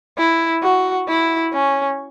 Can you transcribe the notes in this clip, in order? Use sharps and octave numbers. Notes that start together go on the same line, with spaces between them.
E4
F#4
E4
C#4